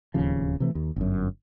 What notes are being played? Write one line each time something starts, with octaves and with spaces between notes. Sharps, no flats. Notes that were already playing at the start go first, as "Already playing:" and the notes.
D1 D#2 C#3 F3
C3 E3 A3
D#2
G1 F#2